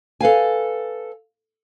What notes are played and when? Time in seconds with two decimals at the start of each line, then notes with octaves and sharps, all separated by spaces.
0.20 A4 B4 F5 G#5